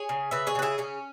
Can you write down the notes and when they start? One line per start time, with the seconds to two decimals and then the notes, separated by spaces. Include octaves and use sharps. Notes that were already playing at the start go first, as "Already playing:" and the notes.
Already playing: G#4 C#5
0.09 C#3
0.31 C#3 B4 E5
0.47 G#4 C#5
0.55 C#3 B4
0.62 E4 G#4
0.78 C#3 C#4